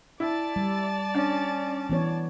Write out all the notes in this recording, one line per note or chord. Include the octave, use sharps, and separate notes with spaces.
E4 D5 A5
G3
C#4 D4
E3 B3 C#5